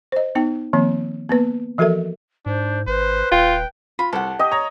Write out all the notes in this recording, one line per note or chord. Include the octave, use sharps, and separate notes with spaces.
C5 D#5
B3 D#4 G5
D#3 F3 A#3 C4
A#3 B3 B4
E3 F3 F#4 A4 A#4 E5
G#2 D4 C5
G#1 B4 C5
D#1 F4 G5
F4 B5
C2 A4 F#5
G4 D#5
C#5 A#5